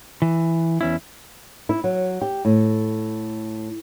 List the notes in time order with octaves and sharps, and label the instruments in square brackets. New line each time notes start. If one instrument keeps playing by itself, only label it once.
[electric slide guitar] E3
E2 C#4 E4
[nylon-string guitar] E4
F#3
G4
A2